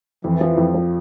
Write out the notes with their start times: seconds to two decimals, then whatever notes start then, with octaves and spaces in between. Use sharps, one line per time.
0.24 F2 E3
0.41 F3
0.57 F2
0.75 F3